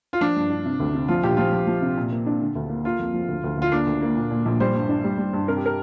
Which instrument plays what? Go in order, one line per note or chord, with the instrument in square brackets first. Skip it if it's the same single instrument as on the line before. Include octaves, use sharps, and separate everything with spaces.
[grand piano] F4
[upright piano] F3 [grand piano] D4
[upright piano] G2
D4
C3
D2
C3
[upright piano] F3 [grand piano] F4
[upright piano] A#1 [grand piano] G4
[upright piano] F3 [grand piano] F4
[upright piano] F3
F3
C3
A#2
A#3
D4
D3
D2
A#3
[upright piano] A#3 [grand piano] F4
[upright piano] F2
F3
D2
D2
[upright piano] D2 [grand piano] F4
[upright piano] A#3 [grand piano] D4
[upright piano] D2
A#3
A#2
A#2
A#1
[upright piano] G3 [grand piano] C5
[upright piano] G2
D4
G3
G3
G2
[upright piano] C3 [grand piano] A#4
[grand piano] G4
A#4